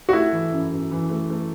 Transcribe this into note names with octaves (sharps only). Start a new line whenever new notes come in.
F#4
A3 E4
E3
F#2
F#2
E3
A3
A3